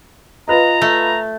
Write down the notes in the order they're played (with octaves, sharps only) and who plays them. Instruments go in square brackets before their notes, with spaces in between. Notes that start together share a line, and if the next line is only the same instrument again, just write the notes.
[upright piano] F4 B4 D#5 [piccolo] A#5
[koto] A3